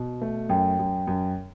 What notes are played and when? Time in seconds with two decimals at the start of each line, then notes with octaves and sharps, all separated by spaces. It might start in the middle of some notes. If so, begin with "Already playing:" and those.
Already playing: B2
0.22 A3
0.49 F#2 G5
0.79 F#2
1.07 F#2